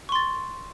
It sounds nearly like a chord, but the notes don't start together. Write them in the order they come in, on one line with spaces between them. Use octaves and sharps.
C#6 C6 A6